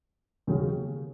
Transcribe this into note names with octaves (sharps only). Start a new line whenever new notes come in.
D#2 C#3 F#3 C#4 G#4